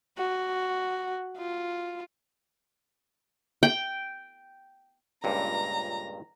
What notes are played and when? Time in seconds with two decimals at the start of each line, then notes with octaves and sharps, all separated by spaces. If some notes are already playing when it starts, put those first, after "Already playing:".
0.18 F#4
1.38 F4
3.63 G5
5.24 C#2 G2 A#2 A#5